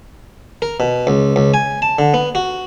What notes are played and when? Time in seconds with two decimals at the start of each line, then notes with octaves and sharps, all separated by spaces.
0.62 A#4
0.80 B2
1.07 C#2
1.36 C#2
1.54 G#5
1.82 A5
1.99 D3
2.14 B3
2.35 F#4